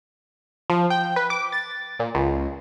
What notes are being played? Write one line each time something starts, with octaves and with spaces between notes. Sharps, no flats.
F3
G5
B4
D6
A6
A#2
C#2